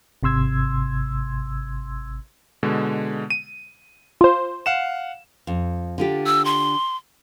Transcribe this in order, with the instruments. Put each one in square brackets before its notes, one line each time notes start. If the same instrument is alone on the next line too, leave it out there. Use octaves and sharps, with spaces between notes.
[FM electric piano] G#1 C3 C6 E6 G#6
[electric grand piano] B2 D3 G#3
D#7
[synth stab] F4 C5
[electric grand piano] F5 F#5 E7
[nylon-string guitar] F2
D3 F4 G4
[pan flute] E6
C6